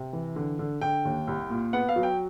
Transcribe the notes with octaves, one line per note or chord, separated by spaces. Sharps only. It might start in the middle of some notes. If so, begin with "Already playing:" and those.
Already playing: C3
E3
D3
D3
D3 G5
D#2
C2
A#2
B3 F#5
F5
F#3
G5